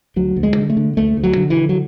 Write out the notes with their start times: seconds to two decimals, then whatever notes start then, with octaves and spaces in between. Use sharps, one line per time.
0.16 D2 F#3
0.36 D2
0.43 G#3
0.56 D3
0.70 A3
0.77 D3
0.97 D2 A3
1.17 D2
1.23 F#3
1.37 D3
1.50 E3
1.57 D3
1.69 F#3